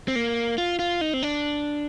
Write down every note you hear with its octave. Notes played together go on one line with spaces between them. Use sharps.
C4
A#3
F4
F4
D#4
C4
D4